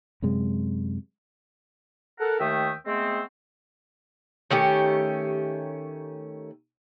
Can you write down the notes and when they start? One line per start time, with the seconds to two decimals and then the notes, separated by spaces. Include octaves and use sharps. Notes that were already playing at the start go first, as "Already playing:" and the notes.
0.22 F#2 C3 G#3
2.20 A4 A#4 F#5
2.40 D#2 D#3 A3 E5 G5 D#6
2.86 G#3 A3 B3 C4
4.51 D#3 A3 C#4 G4